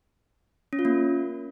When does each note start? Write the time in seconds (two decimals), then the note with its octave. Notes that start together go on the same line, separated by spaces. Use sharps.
0.73 C#4
0.79 F4
0.85 A#3